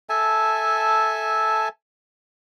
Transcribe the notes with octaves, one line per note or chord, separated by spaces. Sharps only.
A4 E5 G#5 A5